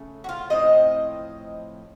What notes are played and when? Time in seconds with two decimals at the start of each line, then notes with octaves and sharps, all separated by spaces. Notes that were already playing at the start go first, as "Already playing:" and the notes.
Already playing: C#3 A3 C#4
0.24 F#4
0.29 F4
0.50 A2 F3 C4 D#5